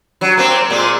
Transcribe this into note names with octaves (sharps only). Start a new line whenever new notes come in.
F#3
A#3 C4
A#2 G#3 A#3